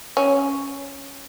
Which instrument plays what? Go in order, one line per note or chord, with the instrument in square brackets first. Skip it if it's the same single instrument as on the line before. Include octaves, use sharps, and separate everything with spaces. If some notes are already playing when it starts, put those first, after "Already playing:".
[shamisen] C#4